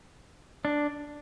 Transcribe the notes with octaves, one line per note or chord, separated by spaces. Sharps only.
D4